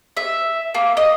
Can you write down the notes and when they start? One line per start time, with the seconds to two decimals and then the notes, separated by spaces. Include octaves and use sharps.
0.17 E5
0.75 A#3
0.97 D#5